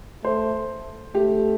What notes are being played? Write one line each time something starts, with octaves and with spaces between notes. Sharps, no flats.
A3 C5
A3 G4